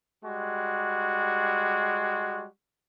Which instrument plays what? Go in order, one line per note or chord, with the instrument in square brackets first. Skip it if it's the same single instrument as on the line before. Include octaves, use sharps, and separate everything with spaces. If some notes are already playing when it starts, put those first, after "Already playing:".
[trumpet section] G3 G#3 F#4